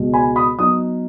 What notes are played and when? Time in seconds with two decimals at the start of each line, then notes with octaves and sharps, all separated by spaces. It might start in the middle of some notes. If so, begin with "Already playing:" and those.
Already playing: C#2 B2 G#3
0.13 G#5 B5
0.36 B5 D#6
0.59 F#3 B3 D#4 D#6